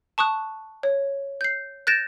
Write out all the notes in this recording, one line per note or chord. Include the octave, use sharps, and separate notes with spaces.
A5 C#6 D#6 F#6
C#5
G6 C7
F#6 G6 A6 A#6 D7 E7